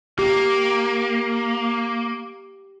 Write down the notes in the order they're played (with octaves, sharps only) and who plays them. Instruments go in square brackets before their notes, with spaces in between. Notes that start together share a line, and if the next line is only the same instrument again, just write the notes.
[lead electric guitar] A#3 [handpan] G4